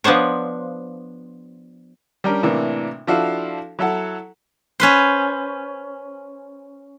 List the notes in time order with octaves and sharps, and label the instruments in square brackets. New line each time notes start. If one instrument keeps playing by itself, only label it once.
[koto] F3 B3 D4 C5 C#5
[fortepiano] G3 C#4 D4 A#4
A2 C3 E3 A#3 D4
F3 D4 E4 F#4 A4 F5
F#3 E4 A4 F#5
[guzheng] C#4 B4 C5